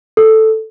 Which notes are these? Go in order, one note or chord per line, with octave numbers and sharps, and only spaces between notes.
A4